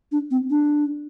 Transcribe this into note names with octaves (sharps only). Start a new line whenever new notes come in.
D4
C4
D4